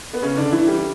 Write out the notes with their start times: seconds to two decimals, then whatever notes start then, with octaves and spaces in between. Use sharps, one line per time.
0.13 B3
0.22 C#3 C#4
0.37 D3 D4
0.52 E3 E4
0.67 G3 G4